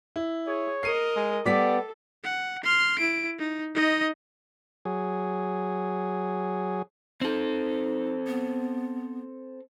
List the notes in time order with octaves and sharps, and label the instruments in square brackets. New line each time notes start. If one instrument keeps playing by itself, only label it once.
[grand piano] E4
[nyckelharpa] G#4 [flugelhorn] C#5
[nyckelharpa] A#4 D#5 [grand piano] C7 C#7 D#7
[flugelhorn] G#3
[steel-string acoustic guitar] G3 B3 G4 [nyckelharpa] A4 [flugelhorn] D5 [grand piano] D6 B6
[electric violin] F#5
C6 F6
E4 D7
D#4
D#4 D#5
[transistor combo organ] F#3 G#4
[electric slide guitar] C4 A4 [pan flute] D#4
[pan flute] B3